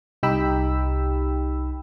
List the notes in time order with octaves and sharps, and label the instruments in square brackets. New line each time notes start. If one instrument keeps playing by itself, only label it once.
[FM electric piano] C2 D#4 G4 G5 B5 E6